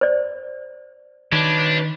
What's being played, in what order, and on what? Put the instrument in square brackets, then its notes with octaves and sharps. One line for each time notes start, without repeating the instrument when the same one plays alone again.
[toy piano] C5 D5
[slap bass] D#3 [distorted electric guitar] D4 [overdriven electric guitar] B4 C#5